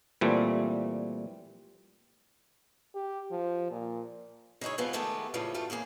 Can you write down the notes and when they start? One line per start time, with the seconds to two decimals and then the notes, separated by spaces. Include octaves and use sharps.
0.21 A#2 E3 G3 A3 C4
2.95 G4
3.31 F3
3.71 A#2
4.61 C#3 G#3 D#4 E4 C#5
4.78 C3 E3 F3 G#3 B3 F4
4.93 D#3 G#3 A3 B3 G4
5.34 A2 C#3 E3 F3 G3
5.54 F#2 A3 F4 G4
5.70 E2 C#3 A#3 G#4